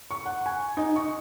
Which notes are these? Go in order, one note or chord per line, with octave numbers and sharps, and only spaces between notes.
C#6
F#5
G#5
D#4
C#6